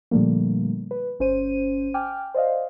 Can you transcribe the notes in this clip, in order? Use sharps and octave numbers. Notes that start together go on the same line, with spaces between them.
A#2 D3 F3 G3 A3 A#3
B4
G1 C#4 C5 D#7
G5 G#5 D6 F6
C5 D5 D#5 F5